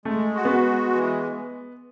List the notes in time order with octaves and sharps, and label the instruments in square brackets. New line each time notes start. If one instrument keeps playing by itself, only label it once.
[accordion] G#3 [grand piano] A3
[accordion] F#4
[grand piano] B3
[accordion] G#3
E3